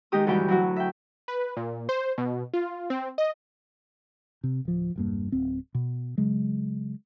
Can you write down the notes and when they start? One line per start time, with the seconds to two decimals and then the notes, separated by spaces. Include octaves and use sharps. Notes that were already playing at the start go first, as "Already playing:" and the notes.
0.12 D#3 G#3 D#4 G4 D#6
0.27 D2 G2 E3 F#4 G4 G5
0.48 F#3 E4 F#4
0.76 E5 G5
1.28 B4
1.57 A#2
1.89 C5
2.18 B2
2.54 F4
2.90 C4
3.18 D#5
4.44 C3
4.65 D1 F3
4.96 E1 G2 A#3
5.32 D1 C4
5.75 B2
6.18 C#3 F#3 G#3